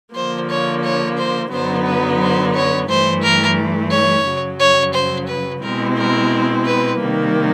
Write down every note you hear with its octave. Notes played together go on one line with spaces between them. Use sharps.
D3 F3 A#3 C5
C#5
C#5
C5
F#2 D3 F#3 B3 D#4 C5
B4
C5
C#5
G2 E3 A3 C5
A#4
C#5
F#2 C#3 F#3
C#5
C5
B4
B2 G#3 C4 E4 A#4
A#4
B4
C3 D#3 G3 A#3